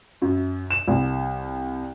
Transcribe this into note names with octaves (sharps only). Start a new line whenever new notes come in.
F#2
E7
C2